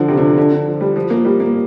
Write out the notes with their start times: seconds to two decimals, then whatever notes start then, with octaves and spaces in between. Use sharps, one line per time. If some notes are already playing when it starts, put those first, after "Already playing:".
Already playing: D3 F3
0.08 C3
0.17 D3
0.27 F3
0.38 D3
0.52 D3
0.67 F3
0.81 G3
0.96 F3
1.10 A#3
1.25 G3
1.40 A#3